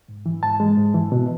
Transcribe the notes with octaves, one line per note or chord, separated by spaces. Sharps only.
G#2
E3
G#2 A5
G#3
G#2
E3
B2